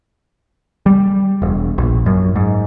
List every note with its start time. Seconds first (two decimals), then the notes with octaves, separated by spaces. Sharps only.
0.86 G3
1.42 E1
1.78 A#1
2.06 F#2
2.35 G#2